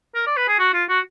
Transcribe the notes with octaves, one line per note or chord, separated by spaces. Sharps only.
A#4
D5
B4
G#4
F#4
F4
F#4